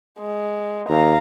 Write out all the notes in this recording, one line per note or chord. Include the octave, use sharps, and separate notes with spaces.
G#3
D#2 F5 A#5